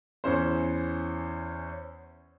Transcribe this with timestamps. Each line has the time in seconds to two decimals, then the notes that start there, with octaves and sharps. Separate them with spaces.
0.24 E2 C#4 C5